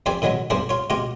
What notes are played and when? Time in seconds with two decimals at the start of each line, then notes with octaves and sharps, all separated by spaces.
0.06 F2 C4 G4 B4 D5 G#5
0.22 A#2 D#3 F#3 G#3 B3
0.50 B1 G2 D4 G#4 B4 C5
0.69 F4 C#5
0.90 B2 G#3 F4 G4